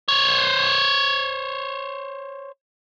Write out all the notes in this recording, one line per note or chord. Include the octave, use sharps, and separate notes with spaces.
C5 C#5